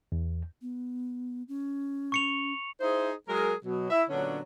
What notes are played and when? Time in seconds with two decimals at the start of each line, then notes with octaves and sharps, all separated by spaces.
0.12 E2
0.62 B3
1.48 C#4
2.12 C#6 C#7 F7
2.80 D#4 E4 G#4 C5
3.28 F#3 G#3 G#4 A#4
3.65 B2 F#3
3.90 E4 E5
4.10 A#2 D3 F#3 B3 C#4 D4